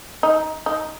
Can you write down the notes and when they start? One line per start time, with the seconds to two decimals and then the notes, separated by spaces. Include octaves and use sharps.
0.23 D#4
0.66 D#4